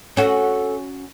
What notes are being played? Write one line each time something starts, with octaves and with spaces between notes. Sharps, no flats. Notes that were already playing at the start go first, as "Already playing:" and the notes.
C#4 F#4 A4